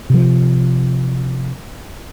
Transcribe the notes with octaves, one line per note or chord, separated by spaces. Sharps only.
C3 F3